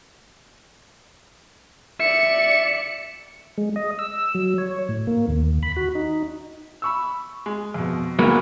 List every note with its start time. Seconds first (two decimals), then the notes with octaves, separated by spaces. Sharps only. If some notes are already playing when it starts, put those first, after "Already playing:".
2.00 D5 E5 C#7
3.58 G#3
3.76 D#5
3.99 E6
4.35 F#3
4.58 C#5
4.89 A2
5.07 A#3
5.28 D#2
5.63 B5
5.76 F#4
5.95 D#4
6.82 B5 C#6 E6
7.46 G#3
7.74 F2 B2
8.19 D2 F#3 G#3 A#3 B3 B5